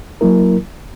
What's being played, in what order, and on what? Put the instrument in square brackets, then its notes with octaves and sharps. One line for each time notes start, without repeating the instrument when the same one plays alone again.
[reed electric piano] F#3 A#3 E4 A#4